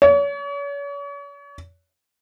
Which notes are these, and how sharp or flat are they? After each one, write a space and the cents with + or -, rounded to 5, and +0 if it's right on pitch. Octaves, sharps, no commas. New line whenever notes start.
C#5 +40